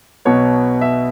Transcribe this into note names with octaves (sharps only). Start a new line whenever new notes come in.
B1 B2 B3 C#5
E5